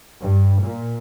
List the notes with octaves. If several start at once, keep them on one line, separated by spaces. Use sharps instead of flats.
G2
A#2